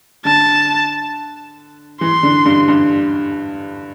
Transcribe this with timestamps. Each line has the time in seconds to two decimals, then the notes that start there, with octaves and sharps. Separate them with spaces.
0.25 D3 A5
2.01 E3 C6
2.23 D3
2.45 G2
2.68 G2